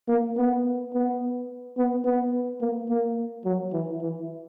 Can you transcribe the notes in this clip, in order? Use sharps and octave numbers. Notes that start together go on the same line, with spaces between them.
A#3
B3
B3
B3
B3
A#3
A#3
F#3
E3
E3